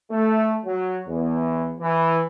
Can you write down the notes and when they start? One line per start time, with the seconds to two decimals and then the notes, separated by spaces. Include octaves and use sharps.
0.11 A3
0.65 F#3
1.08 E2
1.80 E3